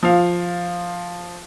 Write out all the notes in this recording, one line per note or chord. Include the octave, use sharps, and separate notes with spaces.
F3 F5